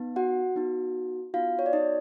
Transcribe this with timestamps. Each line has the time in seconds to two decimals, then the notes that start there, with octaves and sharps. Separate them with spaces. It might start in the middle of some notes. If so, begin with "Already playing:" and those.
Already playing: B3 D#4
0.16 F#4 F#5
0.56 B3 D#4 F#4
1.34 B3 D#4 F4 F#4 F5
1.59 C#5
1.66 D5
1.73 D#4 D#5